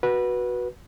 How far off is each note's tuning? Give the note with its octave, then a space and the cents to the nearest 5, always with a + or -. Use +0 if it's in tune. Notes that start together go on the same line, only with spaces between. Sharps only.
F#4 +0 B4 -15